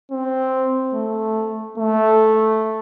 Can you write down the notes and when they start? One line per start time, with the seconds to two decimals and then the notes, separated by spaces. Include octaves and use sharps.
0.11 C4
0.94 A3
1.78 A3